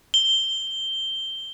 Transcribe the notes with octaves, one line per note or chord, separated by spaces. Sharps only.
G7